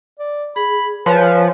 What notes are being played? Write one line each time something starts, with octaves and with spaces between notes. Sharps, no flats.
D5
G#4 B5
F3 B4 C#5 G#5